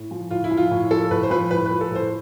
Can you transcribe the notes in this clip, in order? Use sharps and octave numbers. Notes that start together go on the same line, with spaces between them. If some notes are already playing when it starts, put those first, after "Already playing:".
Already playing: A2
F3
A2 F4
E4
F3
F4
A2
F3 A4
A2 B4
C5
F3 B4
A2 B4
F3 B4
A4
A2 C5